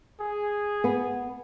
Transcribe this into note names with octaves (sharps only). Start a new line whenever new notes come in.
G#4
B3